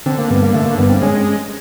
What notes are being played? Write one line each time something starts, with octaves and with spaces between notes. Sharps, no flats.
D3 C4
A#3
G2 B3
A#3
D3 A3
A#3
G2 B3
C4
G#3 C#4